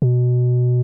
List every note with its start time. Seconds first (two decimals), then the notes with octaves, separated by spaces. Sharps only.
0.02 B2